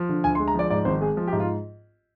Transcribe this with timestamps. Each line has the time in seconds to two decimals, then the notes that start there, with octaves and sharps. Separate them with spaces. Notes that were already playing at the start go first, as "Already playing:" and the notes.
Already playing: F3
0.09 D3
0.24 D2 G#5
0.35 C6
0.39 G#3
0.48 A#5
0.54 F3 D5
0.70 G#2 D5
0.85 G#1 C5
1.01 G#3 G#4
1.17 F3
1.27 G4
1.32 G#2
1.40 F4